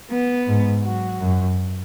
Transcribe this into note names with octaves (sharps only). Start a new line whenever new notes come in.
B3
G#2
F#3 F#4
F#2